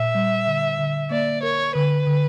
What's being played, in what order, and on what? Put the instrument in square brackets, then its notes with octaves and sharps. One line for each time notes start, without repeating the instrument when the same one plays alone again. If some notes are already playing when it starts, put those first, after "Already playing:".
Already playing: [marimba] A#2 [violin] E5
[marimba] G3
D3
D3
[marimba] A#3 [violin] D5
[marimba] A#4 [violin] C#5
[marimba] D3 [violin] B4
[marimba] D3